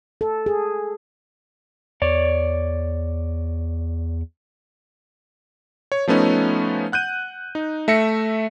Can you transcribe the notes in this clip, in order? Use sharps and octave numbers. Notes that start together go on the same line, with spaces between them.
A4
G#4
E2 C#5 D5
C#5
F3 A3 B3 C#4 D#4
F#5 F#6 G6 D#7
D#4
A3 E5 A#6 C#7